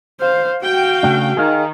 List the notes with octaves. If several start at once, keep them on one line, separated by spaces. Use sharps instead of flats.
C5 F5
F#4 F5 G5
C#3 A3 D4
D#3 G#4 F5